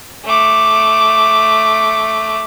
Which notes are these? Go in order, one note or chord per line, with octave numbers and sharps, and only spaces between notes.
A3 D6